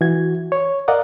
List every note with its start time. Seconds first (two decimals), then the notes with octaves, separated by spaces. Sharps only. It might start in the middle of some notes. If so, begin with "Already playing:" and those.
0.01 E3 F#4 G#6
0.52 C#5
0.88 A#4 D5 D#5 F5 F#5